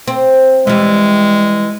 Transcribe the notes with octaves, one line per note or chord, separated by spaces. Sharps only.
C4
E3 G3 G#3